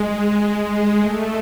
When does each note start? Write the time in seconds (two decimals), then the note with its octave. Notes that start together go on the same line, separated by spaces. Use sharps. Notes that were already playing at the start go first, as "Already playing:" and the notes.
Already playing: G#3
1.00 A3